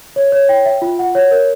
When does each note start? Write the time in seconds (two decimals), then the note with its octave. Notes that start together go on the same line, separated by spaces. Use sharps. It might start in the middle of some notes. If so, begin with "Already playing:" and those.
0.16 C#5
0.32 C#5
0.49 G5
0.65 E5
0.82 F4
0.99 F#5
1.15 C#5
1.31 A#4